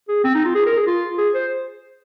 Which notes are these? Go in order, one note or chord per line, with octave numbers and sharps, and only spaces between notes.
G#4
C4
D#4
F4
G#4
A#4
G#4
F4
G#4
C5